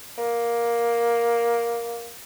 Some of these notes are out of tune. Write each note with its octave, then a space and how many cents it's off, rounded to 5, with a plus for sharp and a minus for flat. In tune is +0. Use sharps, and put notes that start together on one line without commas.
A#3 +10